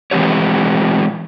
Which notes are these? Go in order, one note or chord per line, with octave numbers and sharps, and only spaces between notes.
E3 G#3 C4 G4 C#5